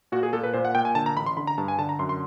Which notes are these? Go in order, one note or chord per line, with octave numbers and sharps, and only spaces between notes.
A#2 F#4
G#4
A#2 A4
B4
A#2 C5
F#5
A#2 G5
G#5
D3 A5
A#5
A1 B5
C6
D3 B5
A#5
G2 A5
G#5
D3 A5
A#5
F#2 C6
C6